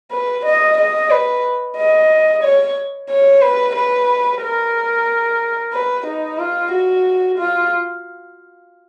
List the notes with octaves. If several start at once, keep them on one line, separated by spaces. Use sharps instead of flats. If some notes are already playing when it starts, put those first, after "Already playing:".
B4
D#5
D#5
B4
D#5
C#5
C#5
B4
B4
A#4
B4
D#4
F4
F#4
F4